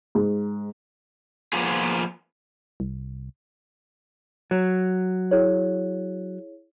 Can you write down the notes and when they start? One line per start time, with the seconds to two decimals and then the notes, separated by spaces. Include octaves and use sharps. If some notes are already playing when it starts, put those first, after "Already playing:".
0.15 G#2
1.53 F3 A#3 B3 F4 G#4
2.80 C2
4.51 F#3
5.31 E4 G#4 C#5